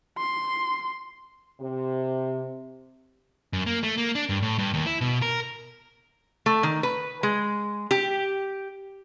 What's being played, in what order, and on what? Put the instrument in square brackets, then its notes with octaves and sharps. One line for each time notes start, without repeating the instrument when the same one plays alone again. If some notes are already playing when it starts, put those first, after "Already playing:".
[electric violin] C6
[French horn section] C3
[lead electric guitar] F#2
A#3
A3
A#3
D4
G2
A2
G2
D#2
E4
B2
A#4
[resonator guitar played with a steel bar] A3
D#3
B4
G#3
G4